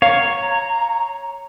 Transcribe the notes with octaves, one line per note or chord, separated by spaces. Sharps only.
C#5 F5 A#5